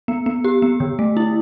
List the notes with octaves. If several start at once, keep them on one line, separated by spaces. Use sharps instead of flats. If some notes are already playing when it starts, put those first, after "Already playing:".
B3
B3
G4
B3
D3
A3
E4